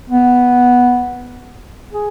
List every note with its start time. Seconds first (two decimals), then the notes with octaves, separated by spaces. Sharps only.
0.09 B3
1.93 G#4